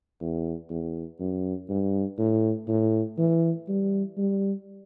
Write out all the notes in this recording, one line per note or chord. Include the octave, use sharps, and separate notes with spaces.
E2
E2
F#2
G2
A2
A2
E3
G3
G3